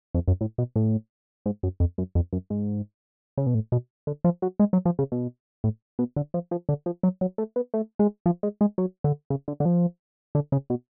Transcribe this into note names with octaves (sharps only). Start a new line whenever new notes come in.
F2
F#2
A2
B2
A2
G#2
F#2
F2
F#2
F2
F#2
G#2
C#3
B2
A2
B2
D3
F3
F#3
G#3
F#3
F3
C#3
B2
A2
B2
D3
F3
F3
D3
F3
F#3
F#3
A3
B3
A3
G#3
F3
G#3
G#3
F#3
D3
C#3
D3
D3
F3
D3
C#3
B2